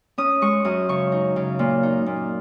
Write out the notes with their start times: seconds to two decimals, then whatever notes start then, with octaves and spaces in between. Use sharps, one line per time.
0.18 C#4 D#6
0.42 G#3 C#6
0.65 F#2 D#6
0.89 C#3 C#6
1.12 D#4
1.36 C#3
1.59 A#2
1.83 D#4
2.06 A#2